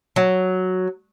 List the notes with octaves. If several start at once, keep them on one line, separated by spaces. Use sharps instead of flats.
F#3